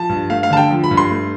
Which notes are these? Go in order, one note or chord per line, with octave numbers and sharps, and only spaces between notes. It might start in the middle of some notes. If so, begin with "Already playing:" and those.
Already playing: F3 A5
G2
A3 F5
F5
D3 A5
G5
F3
B5
G2
C6
A3